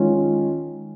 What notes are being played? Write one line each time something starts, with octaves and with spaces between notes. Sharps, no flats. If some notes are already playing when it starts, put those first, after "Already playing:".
Already playing: D#3 G#3 C#4 F4